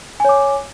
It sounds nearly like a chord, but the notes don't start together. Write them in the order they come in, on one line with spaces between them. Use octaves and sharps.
G#5 C#5 D6